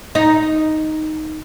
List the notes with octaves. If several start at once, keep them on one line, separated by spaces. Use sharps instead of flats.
D#4